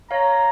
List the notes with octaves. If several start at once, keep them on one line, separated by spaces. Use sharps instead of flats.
C#5 F5 A#5